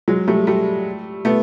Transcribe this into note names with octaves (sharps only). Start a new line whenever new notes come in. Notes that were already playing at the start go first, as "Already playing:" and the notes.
F#3 G#3
G3 A3
G3 A3
A3 B3